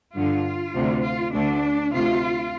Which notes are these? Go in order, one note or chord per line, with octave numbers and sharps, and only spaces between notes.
G2 D3 F4
D2 C3
F4
D2 D3 D4
D2 C3 F4